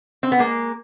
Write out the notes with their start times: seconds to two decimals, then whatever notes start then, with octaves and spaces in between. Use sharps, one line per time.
0.23 C4
0.32 B3
0.39 G#3 A#3